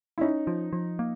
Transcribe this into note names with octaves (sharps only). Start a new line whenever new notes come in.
E4
C#4 D#4
F3
F3
A#3